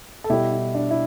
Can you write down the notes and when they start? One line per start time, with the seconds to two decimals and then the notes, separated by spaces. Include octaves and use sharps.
0.24 A4
0.30 B2 G3 E4 G4
0.52 E4
0.74 D4
0.90 E4